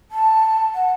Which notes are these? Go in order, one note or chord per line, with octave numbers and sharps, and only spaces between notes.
A5
F#5